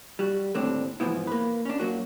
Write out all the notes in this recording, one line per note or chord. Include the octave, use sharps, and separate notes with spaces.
G3 F#4
D#2 A2 D3 C4 D4
G#2 E3 F3 B3 E4
A#3 B4
C#4 D4
F#3 A#3 F#4